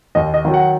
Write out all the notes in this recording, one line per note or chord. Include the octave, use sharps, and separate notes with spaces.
D#2 D#5
D#5
D#3 F#3
F#5